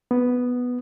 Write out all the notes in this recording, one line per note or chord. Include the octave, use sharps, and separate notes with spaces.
B3